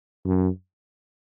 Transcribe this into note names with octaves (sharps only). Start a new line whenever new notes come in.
F#2